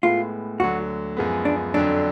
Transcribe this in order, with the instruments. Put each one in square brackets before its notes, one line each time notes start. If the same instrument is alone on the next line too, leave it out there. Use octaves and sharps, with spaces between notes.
[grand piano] A2 G#3 B3 [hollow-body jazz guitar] F4
[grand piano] D2 D3 F#3 [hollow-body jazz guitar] F#4
[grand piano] F#2 F3 G#3 B3
[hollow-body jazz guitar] D4
[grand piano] F2 D3 F#3 [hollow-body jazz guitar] D4